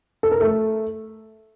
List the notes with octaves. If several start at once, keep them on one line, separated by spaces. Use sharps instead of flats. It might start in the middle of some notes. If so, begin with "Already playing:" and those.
A4
A#4
A3 A4